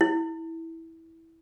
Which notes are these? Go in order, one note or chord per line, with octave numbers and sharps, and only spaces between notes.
E4